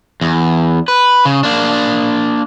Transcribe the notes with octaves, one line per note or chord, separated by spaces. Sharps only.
E2
B4
C#3
A#3 D4